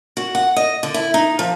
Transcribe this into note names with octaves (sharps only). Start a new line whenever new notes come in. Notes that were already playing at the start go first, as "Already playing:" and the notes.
F#4
F#5
D#5
D3
E4
D#4
F3